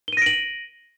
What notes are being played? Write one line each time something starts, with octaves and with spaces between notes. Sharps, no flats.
A#6 D7 D#7 F#7 G7